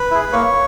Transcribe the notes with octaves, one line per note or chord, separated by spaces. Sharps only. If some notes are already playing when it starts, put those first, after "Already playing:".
Already playing: B4
E4 G#4
A#3 C#5